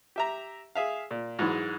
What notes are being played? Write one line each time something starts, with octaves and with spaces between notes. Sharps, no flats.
G4 E5 A#5
G#4 E5 F5
A#2
G#2 E3 F#3 G#3